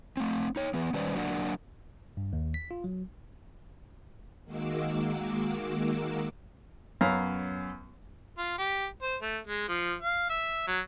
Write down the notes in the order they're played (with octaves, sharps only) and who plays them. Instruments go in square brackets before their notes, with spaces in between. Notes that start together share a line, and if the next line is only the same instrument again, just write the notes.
[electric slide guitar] A3 C4
D#4 C#5
E3 B3
D#3 G3 C#4 B4 C5 D5
F#3 A#3 C4 D4 F#4
[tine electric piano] G2
D#2
B6
F4
F#3
[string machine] D#3 G#3 A#3 F#4 D6 E6
[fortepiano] F#2 B3 C#4 F5 A#5
[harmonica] F4
G4
C5
A3
G#3
F3
F5
E5
F#3